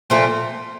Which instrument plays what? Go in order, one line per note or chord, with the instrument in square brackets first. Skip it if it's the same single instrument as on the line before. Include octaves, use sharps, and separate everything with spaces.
[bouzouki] A#2 F3 A3 C4